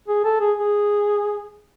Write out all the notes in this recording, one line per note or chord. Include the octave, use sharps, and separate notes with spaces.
G#4
A4
G#4
G#4